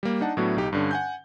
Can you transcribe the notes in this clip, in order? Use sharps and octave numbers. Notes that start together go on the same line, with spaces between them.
G3 A#3
D4 D#4 F#5 A5
A2 F#3 B3 D4 E4 F#4
B1 D#4 G4
G2 D3 C#4
F#5 G#5 G6